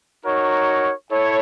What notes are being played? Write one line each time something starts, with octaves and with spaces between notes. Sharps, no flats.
D#4 F#4 A#4 C#5
E4 A4 C#5